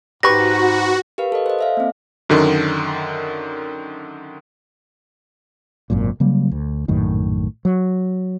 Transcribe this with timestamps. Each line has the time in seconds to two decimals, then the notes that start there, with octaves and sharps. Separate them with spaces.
0.23 G#2 F#4 G4 B4 C#6 A#6
1.18 G4 A#4 B4 F5
1.32 A4 D#5
1.46 C5 D#5
1.59 A4 E5 F5
1.77 A#3 C4
2.29 F#2 D3 D#3
5.90 G#1 F#2 A#2
6.20 C#3 F#3 G3 A#3
6.51 D2
6.88 A#1 F#2 A2 D#3
7.65 F#3